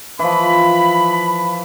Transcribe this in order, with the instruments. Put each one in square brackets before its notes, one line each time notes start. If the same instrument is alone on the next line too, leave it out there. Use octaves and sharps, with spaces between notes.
[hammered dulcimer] E3 F3 [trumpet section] B5